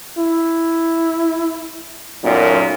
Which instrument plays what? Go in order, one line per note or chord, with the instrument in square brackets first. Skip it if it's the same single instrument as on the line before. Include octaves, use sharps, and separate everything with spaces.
[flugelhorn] E4
[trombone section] B1 F#2 A#2